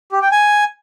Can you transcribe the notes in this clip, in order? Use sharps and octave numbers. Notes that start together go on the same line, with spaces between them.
G4
G5
G#5